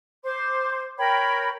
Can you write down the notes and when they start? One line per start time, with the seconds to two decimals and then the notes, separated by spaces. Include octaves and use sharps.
0.23 C5 C6 D6
0.98 A#4 C#5 G5 B5